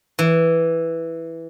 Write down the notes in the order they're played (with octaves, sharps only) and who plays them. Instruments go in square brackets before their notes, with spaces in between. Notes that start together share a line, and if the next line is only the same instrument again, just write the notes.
[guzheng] E3